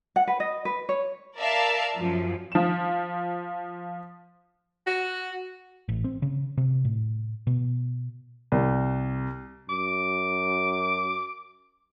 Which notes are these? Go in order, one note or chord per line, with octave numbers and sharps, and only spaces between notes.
F#5
B4
D#5
B4
C#5
A#4 D5 E5 F5 A5
F#2 F3
F3 E7
F#4
A1
C4
C#3
C3
A2
B2
C2
F#2 D6